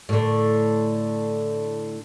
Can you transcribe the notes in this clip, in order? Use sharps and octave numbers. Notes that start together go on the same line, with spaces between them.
A2 D3